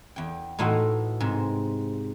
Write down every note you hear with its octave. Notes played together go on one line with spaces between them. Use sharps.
E2 G5
A2 E3 D#4 F#4 E5 C6
G#2 C3